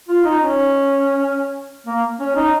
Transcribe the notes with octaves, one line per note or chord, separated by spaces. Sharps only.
F4
D#4
C#4
A#3
C#4
D#4